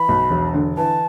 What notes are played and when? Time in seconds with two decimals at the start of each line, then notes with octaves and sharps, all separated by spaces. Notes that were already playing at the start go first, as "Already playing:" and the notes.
Already playing: E3 B5
0.09 B1
0.30 E1
0.54 D3
0.77 E3 A5